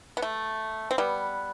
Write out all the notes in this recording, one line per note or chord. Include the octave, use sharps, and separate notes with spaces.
B3
A3
C4
G3 B3